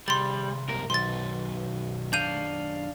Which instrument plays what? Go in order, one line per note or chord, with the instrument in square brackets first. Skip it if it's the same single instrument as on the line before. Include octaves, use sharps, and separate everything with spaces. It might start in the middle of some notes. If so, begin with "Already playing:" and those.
[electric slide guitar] C3 G#4 [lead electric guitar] G3 [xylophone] C6 A6
[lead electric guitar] C2 A#4 [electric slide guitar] F#2 B2 A#3
[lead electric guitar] B1 [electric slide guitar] F#2 D#3 B4 [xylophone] C6 A6
[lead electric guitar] D4 F5 [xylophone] G6 D#7